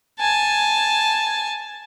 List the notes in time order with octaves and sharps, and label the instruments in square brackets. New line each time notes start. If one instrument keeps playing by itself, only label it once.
[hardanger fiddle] G#5 A5